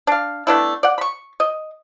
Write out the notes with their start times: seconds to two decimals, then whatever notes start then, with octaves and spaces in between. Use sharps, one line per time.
0.07 D4 F5
0.47 A3 B3 D4 E4
0.83 D5 F#5
0.98 B5 C#6
1.40 D#5